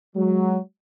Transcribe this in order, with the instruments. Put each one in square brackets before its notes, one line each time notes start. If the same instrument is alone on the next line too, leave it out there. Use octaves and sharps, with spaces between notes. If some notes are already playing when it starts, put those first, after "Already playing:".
[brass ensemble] F#3 [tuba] G#3